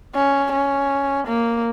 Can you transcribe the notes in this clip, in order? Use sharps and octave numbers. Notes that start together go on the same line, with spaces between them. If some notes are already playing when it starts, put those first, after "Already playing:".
C#4
C#4
A#3